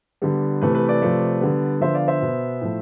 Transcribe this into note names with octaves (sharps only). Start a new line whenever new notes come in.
D3 G3 B3
C3 E3 A3 B4
B4
B4 D5
C3 F3 A3
D3 G3 B3
D3 F3 B3 C5 E5
D5 F5
C5 E5
B2 B3
A2 F3 A3